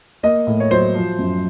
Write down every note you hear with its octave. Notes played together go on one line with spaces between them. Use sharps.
A#3 D#5
A2
C#5
F#3 C5
F3
F#2